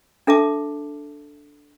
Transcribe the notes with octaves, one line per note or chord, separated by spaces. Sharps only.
D4 A4 E5 A5 D6